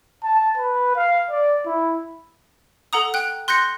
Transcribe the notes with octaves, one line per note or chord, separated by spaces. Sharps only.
A5
B4
F5
D5
E4
A4 F#5 A#5 D#6
G5 F#6
C6 F#6 G6 A#6 C#7